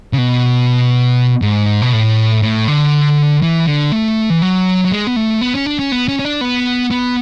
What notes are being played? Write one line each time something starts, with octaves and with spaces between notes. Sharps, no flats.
C#3
B2
G#2
B2
A2
A2
D3
E3
D3
A3
E3
F#3
F#3
G#3
B3
A3
B3
C#4
D4
C#4
B3
C#4
C#4
D4
B3
B3